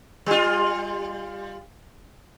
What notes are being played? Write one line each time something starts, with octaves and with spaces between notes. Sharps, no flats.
G3 F4